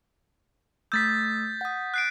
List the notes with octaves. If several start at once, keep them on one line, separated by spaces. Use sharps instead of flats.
A3 D#6 E6 G6 A6 B6
F#5 D#6
F#6 C7 D7